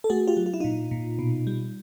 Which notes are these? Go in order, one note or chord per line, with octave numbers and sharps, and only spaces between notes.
A4
A3 F#4 G#4
F4 G4
F#3
F4
E4
A#2 D#4 F4
A#2
B2
G3